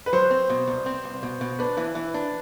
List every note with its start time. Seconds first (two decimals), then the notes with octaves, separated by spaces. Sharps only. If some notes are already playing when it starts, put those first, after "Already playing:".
0.06 B4
0.13 F#3 C5
0.31 C4
0.50 B2
0.68 C2
0.86 C4
1.04 C2
1.23 B2
1.41 B2
1.59 D4 B4
1.77 E3
1.95 E3
2.14 D4